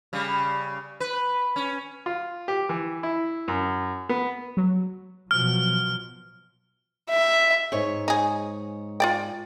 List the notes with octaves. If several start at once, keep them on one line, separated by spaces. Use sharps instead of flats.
C#3 G3
B4
C#4
F4
G4
E3
E4
F#2
B3
F#3
B2 F3 F#3 F6
E5
G#2 C#5
D#4 G#4
F4 D5 G5